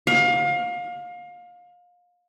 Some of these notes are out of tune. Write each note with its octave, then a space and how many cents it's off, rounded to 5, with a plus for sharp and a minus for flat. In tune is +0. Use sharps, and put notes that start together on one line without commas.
F5 +30